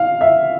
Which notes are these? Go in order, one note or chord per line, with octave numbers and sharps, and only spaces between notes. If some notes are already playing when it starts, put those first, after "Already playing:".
Already playing: F5
E5